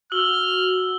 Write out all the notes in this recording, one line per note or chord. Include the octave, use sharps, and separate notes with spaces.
F#4 E6 F6 F#7 G7